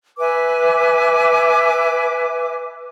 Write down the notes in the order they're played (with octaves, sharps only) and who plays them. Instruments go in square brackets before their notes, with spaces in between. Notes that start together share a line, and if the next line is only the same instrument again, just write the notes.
[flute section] B4 E5 G#5 D6